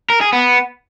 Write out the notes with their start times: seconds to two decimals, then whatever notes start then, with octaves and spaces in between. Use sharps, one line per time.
0.10 A#4
0.21 G#4
0.33 B3